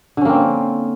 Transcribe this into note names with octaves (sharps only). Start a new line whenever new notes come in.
D3 A#3 C4 C#4